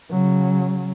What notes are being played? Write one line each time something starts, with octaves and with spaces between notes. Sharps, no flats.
C#3 F#3